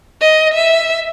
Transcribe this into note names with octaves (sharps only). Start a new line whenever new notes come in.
D#5
E5